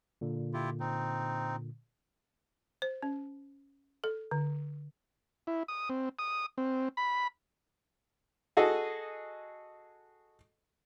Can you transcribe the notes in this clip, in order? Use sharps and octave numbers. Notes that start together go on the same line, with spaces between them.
A#2 D3
E4 F4 G4
C4 D#4
C5
C#4
A4
D3
E4
D#6
C4
D#6
C4
B5
F#4 G#4 A4 D#5